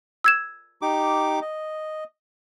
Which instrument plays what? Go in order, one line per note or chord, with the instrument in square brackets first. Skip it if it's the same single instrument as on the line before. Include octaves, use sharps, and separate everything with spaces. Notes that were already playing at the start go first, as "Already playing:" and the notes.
[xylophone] E6 G#6 E7
[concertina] D#4 G4 D6
D#5